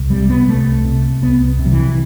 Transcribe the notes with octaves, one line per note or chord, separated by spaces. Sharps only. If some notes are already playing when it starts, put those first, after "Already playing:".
Already playing: C2
C3 G3
B3
C2 A3
C3
C2 B3
C3
F#3
E3